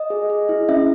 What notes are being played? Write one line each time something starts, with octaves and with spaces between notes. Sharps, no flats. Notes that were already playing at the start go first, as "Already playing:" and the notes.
Already playing: D#5
G#4
G#4
E4
C#4 E5